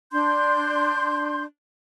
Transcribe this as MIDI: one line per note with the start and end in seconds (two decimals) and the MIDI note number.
0.12 1.44 62
0.12 1.44 84
0.12 1.44 91